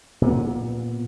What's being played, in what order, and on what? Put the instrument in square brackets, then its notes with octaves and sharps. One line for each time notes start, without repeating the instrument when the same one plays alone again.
[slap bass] A#2 B3